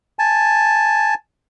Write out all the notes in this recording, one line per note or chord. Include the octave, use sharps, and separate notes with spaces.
G#5 A5